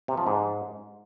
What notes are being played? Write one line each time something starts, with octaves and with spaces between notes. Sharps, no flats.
C3
F3
G#2